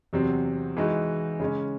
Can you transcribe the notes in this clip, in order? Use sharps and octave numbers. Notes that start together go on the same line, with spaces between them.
E2 C3 F#3 C4
E3 G#3 D#4 F#4
C#3 G#3 C#4